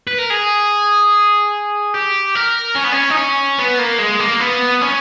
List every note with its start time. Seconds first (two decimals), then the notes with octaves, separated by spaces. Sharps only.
0.07 B4
0.18 A#4
0.30 G#4
1.94 G4
2.35 A#4
2.76 C#4
2.84 B3
2.93 C#4
3.10 D#4
3.17 C#4
3.58 B3
3.79 A#3
3.98 G#3
4.20 A#3
4.40 B3
4.81 C#4